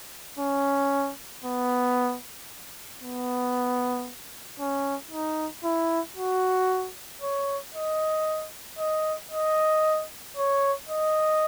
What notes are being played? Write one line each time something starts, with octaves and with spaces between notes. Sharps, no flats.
C#4
B3
B3
C#4
D#4
E4
F#4
C#5
D#5
D#5
D#5
C#5
D#5